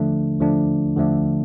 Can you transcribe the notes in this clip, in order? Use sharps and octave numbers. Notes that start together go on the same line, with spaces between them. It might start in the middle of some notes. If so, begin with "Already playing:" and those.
Already playing: D3 F3 A3 D4
D3 F3 A3 D4
D3 F3 A3 D4